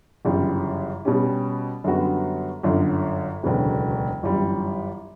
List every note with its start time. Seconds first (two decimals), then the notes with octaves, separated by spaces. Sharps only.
0.25 G1 F#2 C#3 E3 G3
1.05 B2 G3 C#4 G4
1.84 F#2 D3 G3 B3 F#4
2.63 G1 F#2 D3
3.43 E1 D2 C#3 F#3 B3
4.23 G1 F#2 E3 G3